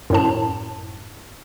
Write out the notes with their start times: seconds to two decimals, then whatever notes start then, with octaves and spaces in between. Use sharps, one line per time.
0.10 F#2 A2 A5